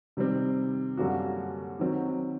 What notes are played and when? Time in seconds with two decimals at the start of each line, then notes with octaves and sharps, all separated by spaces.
0.17 C3 D#3 G3 C4
0.97 F#2 D3 G3 A#3 F#4
1.79 D#3 F#3 C4